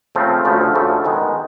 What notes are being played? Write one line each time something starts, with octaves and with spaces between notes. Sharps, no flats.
C#3 F3 A3 C4
D2 C#3 F3 A3
D2 C#3 F3 A3
D#3 G#3 B3 D#4